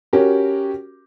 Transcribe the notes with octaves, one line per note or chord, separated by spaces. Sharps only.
C#4 F#4 G4 A#4